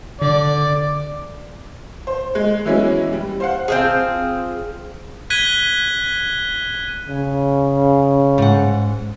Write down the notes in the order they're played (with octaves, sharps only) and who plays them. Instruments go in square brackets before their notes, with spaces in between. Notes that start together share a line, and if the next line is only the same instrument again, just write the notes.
[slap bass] D3 [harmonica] D5
[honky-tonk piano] C5
G#3
E3 F#3 G#3 B3 C#4 E4
G3
C5 F5 F#5
[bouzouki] C4 F4 G#4
[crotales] F#6 G#6 B6 D#7 G7
[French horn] C#3
[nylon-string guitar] G#2 F#5